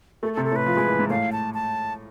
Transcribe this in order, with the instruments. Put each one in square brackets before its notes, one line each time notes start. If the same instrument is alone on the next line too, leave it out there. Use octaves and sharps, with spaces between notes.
[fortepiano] A3 [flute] A4
[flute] A4
[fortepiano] C3
[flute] A4
[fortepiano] A2 [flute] B4
[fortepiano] F3
G#3
E3
G#2
[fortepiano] A2 [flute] F5
[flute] A5
A5